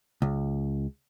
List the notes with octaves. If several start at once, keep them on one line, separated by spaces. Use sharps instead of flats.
C#2